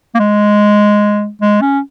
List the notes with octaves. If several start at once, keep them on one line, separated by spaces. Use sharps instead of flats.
A#3
G#3
G#3
C#4